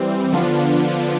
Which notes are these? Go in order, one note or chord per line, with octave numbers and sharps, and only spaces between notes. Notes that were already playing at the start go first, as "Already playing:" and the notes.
Already playing: E3 G3 C4
D3 F3 B3 D4 F4